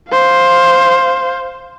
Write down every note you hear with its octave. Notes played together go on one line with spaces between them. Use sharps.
C5 F5